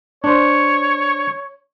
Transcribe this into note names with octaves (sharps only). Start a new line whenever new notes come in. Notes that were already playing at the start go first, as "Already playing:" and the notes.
D4 C5 C#5